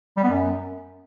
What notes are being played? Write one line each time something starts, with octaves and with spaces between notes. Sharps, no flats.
G3
B3
F#2